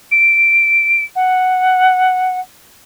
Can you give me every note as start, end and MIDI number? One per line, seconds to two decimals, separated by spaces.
0.11 1.02 98
1.15 2.40 78